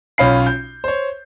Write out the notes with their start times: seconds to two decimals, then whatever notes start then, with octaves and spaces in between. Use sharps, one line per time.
0.18 B1 C#4 F4 B5 C7
0.47 G6
0.84 C5 C#5